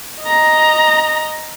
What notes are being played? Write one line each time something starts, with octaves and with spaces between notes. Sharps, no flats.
D#5 A#5